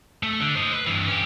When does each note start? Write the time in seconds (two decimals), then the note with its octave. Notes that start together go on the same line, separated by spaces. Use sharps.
0.23 A3
0.40 D3
0.55 C5 D#5
0.74 B4
0.87 G2 E3
1.07 C#4 G4